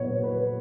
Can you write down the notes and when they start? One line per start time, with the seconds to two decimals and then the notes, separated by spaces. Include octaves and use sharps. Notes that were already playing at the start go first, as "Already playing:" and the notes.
Already playing: A#2 F#3 B3 C#5
0.23 B4